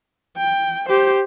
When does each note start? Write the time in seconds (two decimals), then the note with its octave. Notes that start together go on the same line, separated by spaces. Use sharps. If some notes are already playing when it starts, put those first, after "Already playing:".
0.37 G5
0.89 G4 C5